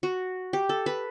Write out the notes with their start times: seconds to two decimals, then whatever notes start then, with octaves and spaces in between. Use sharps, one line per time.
0.03 F#4
0.53 G4
0.69 A4
0.86 B4